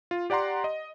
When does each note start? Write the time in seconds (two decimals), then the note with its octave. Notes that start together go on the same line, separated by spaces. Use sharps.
0.11 F4
0.30 G4 D5 F#5 A#5 C6
0.64 D#5